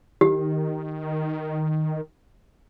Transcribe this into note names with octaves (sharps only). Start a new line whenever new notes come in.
D#3 G4